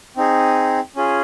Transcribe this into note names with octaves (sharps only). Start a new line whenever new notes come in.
C4 D#4 G#4
C#4 F4 G#4